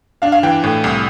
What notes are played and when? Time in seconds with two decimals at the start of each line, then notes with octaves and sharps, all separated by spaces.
0.22 D4 F5
0.32 F5
0.43 E3 G5
0.63 A2 G5
0.84 C2